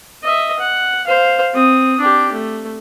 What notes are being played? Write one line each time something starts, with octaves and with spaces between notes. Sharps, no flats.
D#5 E5
F#5
C5 F5
C4 D#6
D4 G4
A3